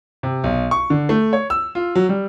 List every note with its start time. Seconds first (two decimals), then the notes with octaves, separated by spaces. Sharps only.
0.23 C3
0.44 B1
0.71 C#6
0.90 D3
1.09 A3
1.33 C#5
1.50 E6
1.75 F4
1.95 F#3
2.09 G3